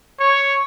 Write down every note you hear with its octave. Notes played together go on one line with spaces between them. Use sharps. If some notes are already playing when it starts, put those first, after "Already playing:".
C#5